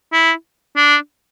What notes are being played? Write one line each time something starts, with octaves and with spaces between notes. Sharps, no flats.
E4
D4